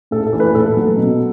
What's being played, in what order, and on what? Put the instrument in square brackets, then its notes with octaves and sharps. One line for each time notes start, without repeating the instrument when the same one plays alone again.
[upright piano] A2 A4
A4
E3
B4
A2 A4
F#3
B2